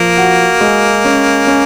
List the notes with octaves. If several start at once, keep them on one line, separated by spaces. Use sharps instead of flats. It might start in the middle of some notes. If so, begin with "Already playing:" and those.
Already playing: F3 A#3
F#4
G#3
C#4
C#4